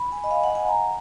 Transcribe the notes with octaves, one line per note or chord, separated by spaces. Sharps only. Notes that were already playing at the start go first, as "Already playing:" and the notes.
Already playing: B5
G#5
D#5
F5
F#5
G#5
A#5